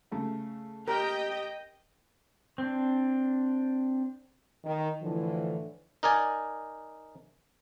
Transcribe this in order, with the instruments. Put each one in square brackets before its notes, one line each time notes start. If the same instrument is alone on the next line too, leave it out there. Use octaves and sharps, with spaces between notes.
[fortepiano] C#3 A3
[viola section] G4 D#5 G5 [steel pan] A#4
[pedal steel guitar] C4 D4
[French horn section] D#3
A2 D3 E3 F3
[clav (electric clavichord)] D#4 A#4 D5 G#5